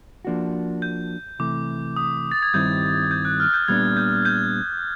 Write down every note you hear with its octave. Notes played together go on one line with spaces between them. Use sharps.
F3 A#3 D4 F#4
G6
C3 E3 A3 D6
D#6
A6
G#6
G2 D#3 G3 C4 E4 G6
G6
F#6
F6
G6
A#2 G3 B3 D4 G#6
G6
G6